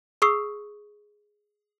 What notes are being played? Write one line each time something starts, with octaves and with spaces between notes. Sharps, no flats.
G#4 C#6 D#6 E6 C7